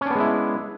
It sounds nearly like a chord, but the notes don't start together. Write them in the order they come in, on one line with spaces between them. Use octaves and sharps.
C#4 D4 B3 G#3 E4